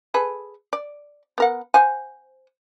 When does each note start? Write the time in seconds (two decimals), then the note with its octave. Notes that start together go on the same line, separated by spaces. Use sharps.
0.14 G#4 A4 B4
0.73 D5
1.38 B3 A#4 F#5
1.74 C5 F#5 G#5